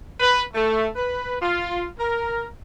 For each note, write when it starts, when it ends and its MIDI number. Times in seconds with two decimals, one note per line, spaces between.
0.19 0.43 71
0.54 0.86 57
0.96 1.37 71
1.41 1.86 65
1.99 2.46 70